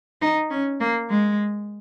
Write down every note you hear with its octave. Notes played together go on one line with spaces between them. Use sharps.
D#4
C#4
A#3
G#3